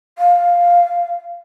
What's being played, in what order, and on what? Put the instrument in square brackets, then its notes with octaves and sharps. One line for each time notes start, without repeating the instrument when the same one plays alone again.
[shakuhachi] F5